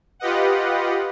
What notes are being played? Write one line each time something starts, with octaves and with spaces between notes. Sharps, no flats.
F4 G4 B4 D#5 F#5